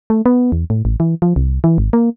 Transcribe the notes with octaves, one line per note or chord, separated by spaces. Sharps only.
A3
B3
E2
A2
A1
E3
F3
C2
E3
G#1
A#3